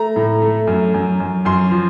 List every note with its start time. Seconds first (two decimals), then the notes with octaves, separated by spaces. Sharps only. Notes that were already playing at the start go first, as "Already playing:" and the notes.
Already playing: A3 A#5
0.16 A2
0.42 A3
0.67 F#2
0.94 F#2
1.20 F#2
1.45 F#2 C6
1.71 F3